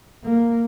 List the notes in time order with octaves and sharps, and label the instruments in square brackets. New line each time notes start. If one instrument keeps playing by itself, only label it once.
[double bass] A#3